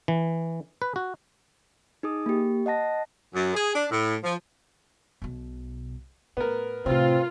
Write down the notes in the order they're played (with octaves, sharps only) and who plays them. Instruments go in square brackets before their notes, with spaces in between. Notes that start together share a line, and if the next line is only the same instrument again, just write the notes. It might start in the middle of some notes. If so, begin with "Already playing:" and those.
[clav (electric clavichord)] E3
B4
F#4
[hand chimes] D#4 G#4 D#6
A#3 G4
D#5 F#5 A5 A#6
[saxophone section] F#2
G#4
D4
A2
F3
[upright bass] B1 B2
[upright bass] A2 [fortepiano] B3 A#4
[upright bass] A2 C3 [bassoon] C4 [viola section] F4